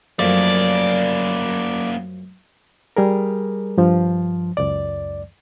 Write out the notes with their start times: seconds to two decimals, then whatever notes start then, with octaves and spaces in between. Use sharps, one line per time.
0.19 F#2 F3 A3 A#3 C#4 D5
2.97 G3 G#4 A#4
3.78 G2 F3
4.57 C#2 F#2 D5